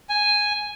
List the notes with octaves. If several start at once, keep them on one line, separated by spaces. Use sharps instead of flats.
G#5